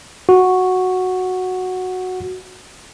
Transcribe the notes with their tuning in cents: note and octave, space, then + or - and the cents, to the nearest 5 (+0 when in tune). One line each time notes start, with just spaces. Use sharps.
F#4 -5